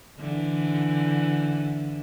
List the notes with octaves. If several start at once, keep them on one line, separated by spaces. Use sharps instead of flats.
D3 E3